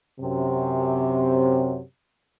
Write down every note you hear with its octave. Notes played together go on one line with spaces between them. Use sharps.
F#2 C3